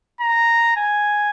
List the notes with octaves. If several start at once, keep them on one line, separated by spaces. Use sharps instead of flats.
A#5
G#5